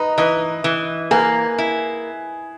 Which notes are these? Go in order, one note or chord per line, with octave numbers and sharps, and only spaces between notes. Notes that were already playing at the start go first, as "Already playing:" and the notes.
Already playing: D#4 B4 D#5
E3 B4 D#5
E3
A#3 G#4 B4
E4